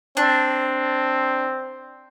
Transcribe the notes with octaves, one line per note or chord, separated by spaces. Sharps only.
C4 D4